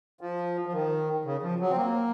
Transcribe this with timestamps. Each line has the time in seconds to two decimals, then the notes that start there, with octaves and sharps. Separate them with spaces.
0.21 F3
0.67 F3
0.73 D#3
1.25 C#3
1.43 F3
1.60 F#3
1.71 C4
1.77 A#3